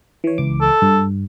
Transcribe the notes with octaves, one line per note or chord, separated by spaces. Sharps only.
E3 C#5
C#2 E3 D6
A4
G2